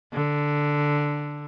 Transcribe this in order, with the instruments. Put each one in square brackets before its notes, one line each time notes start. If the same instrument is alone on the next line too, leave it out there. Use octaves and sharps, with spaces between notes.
[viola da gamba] D3